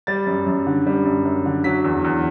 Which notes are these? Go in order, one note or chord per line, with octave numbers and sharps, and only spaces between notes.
G3 A6
F#2
F#2
D3
G3
F#2
F#2
D3
F#3 B6
E2
E2